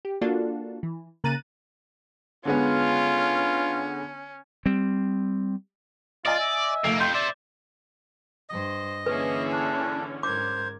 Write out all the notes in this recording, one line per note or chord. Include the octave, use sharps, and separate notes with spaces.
G4
A#3 D4 F4 F#4 A4
E3
C#3 A#3 A#5 F#6 A6 D#7
D3 G#3 B3 C#4 F4
G3 C4
F4 D5 D#5 G#5
E5
F1 A3 A#3
F2 G5 C6 G6
C5 D5 E5
G2 C5 D#5
D3 E3 A#3 C#4 G#4 B4 E5
D4
G#2 A#4 C5 D6 G#6